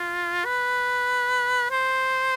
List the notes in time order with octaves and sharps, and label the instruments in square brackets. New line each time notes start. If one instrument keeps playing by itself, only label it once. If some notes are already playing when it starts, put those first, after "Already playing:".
Already playing: [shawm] F4
B4
C5